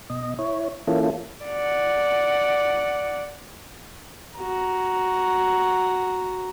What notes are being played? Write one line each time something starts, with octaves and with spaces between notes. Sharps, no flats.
B2 D#5
E4 C#5
E3 A#3 C#4 E4 F4 A4
D5 F#5
F#4 A#5